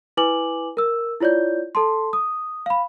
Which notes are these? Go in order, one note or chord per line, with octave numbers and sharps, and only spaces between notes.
E4 B4 G#5 D6 F#7
A#4 E6
E4 F4 C#5 D5 G6
A4 A5 C6
D#6
F5 B5